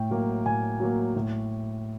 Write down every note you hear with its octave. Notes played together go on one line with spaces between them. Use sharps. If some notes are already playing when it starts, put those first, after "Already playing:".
Already playing: A2 G5
F#3 A#3
A2 G#5
F#3 A#3
A2